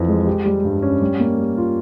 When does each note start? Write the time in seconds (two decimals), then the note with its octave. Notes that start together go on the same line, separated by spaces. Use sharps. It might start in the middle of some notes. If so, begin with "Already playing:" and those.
Already playing: F2 E3 E4
0.08 G#3
0.27 G4
0.46 G3
0.65 G2
0.83 C#4
1.02 G3
1.20 A#3
1.38 G3
1.57 F4